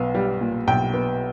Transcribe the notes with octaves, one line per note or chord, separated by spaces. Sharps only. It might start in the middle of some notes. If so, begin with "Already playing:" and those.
Already playing: B1 B3 F5
G3
A#2
B1 G5
B3